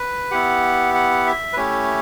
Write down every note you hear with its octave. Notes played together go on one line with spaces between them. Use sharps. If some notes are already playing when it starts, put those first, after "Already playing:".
Already playing: B4
B3 E4 G4 F#5
F#5
E5
B4
A3 C#4 E4 G4 C#5